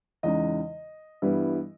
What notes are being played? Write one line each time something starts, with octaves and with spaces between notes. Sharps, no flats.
E2 C#3 G#3 D#4 D#5
G2 E3 G3 B3 E4